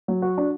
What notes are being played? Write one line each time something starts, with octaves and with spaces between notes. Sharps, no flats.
F#3
F#4
D4